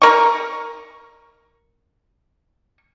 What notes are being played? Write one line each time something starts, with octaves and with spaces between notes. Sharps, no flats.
A#4 C#6